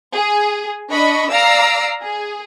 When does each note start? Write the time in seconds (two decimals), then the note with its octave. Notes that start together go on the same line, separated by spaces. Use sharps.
0.14 G#4
0.90 D4 D#5 B5 C#6
1.31 D5 F5 A#5 E6 C7 D7
2.02 G#4